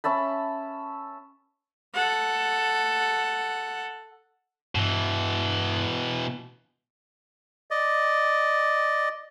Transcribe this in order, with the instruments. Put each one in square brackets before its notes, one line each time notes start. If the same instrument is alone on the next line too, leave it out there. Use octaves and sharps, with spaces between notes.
[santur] C#4 E5 A5 B5
[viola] A4 F#5
[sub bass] G2 [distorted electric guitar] B2 E3
[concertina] D5 D#5